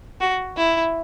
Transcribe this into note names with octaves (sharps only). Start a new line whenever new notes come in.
F#4
E4